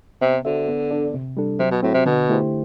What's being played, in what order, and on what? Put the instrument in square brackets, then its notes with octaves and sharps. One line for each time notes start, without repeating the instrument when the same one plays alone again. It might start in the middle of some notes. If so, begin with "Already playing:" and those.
[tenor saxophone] C3 [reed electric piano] B3
[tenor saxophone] D3 [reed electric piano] F#4 C5 E5
[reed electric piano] B3
D4 A4 D5
C3
G3 D4 A4
[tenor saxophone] C3 [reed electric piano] F#3
[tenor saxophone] B2
[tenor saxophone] A2 [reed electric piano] C4 F#4
[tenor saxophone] C3
[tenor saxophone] B2 [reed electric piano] D3
[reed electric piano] A3 E4 G4 C5